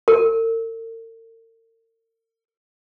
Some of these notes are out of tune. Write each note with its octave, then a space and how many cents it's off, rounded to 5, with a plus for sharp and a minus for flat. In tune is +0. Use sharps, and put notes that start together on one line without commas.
A#4 -45